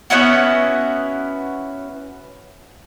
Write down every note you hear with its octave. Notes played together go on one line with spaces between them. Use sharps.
B3 C#4 E4 F#4